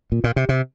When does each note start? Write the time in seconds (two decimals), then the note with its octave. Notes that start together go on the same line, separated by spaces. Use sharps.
0.12 A#2
0.24 A#2
0.36 C3
0.49 C3